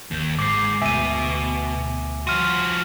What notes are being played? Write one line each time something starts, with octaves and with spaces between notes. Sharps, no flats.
G1 D#2 G6
G#2 D6 C7
D2 B2 E5 G#5 D#7
F3 F#4 C6 F6 D#7